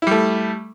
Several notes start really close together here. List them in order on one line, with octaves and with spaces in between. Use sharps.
E4 G3 A3